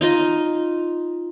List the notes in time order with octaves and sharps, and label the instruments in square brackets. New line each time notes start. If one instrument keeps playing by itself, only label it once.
[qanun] D#4 F4 D#5